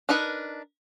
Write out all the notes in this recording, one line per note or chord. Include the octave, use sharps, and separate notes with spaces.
D4 D#4 A#4 B4